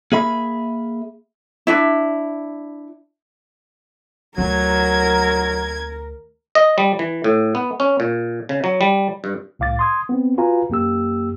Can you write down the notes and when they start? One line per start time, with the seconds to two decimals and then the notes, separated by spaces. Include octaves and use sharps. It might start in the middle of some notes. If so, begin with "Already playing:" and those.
0.12 A#3 G#4 E5 B5
1.67 D4 E4
4.38 D2 F#3 A#4 G#6
6.55 D#5
6.78 G3
6.99 E3
7.24 A2
7.55 B3
7.80 C#4
8.00 A#2
8.49 C#3
8.64 F#3
8.81 G3
9.24 G2
9.59 C2 A2 F5 D6 A6
9.79 C6 D#6 G#6
10.09 B3 C4
10.38 F4 F#4 B4 F5 G#5 A#5
10.70 F#2 A#3 G4 E6